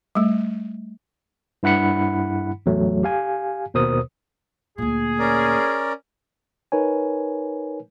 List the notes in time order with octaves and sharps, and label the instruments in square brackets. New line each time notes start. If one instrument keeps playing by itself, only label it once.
[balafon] G3 A3
[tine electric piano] G2 E4 F#5 B5 C#7
A1 E2 F#3 A3
G4 F5 G#5
D#2 B2 A#4 C5 D#6
[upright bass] D2 A#2 [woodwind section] G#4
[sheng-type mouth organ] C#4 A#4 D5
[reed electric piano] D#4 A#4 B4 C#5 G#5